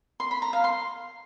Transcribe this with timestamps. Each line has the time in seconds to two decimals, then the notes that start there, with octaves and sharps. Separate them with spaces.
0.20 C6
0.31 B5
0.42 A#5
0.53 F5
0.64 C6